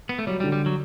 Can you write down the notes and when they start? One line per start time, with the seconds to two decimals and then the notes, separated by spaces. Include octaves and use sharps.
0.09 B3
0.19 A3
0.27 F#3 G3
0.40 G3
0.44 D3
0.52 G3
0.66 F#3